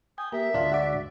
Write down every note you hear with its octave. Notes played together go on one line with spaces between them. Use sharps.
G5 G#5 D#6
A#3 G4 A#4 E5
D2 G#2 D4 F4
F#4 D5